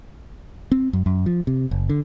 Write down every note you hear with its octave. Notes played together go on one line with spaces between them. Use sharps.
C4
F#2
F#2
F3
C3
F#1
D3